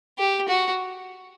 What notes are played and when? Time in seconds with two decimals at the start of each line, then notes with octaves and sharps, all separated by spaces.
0.18 G4
0.48 F#4